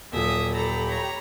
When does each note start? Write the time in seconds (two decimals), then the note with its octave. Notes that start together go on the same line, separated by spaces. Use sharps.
0.12 D#1 A#2 F#3 E5 D#6
0.53 G4 A4 A#5 B5
0.86 C#5 A#5